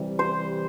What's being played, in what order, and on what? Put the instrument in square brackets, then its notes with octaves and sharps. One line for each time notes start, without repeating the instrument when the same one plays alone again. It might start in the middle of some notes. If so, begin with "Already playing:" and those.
Already playing: [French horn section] C3 E3 G3
[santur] C5